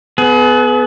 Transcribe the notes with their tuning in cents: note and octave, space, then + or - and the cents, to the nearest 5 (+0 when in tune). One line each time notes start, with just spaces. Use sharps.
B3 +10 G#4 +40